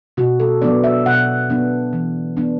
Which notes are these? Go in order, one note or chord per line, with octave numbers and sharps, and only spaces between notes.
B2 F#4
A4
F#3 B3 D4 D5
E5
B2 F#5
F#3 B3 D4
E3
B3 D4